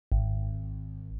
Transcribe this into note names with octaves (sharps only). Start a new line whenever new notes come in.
G#1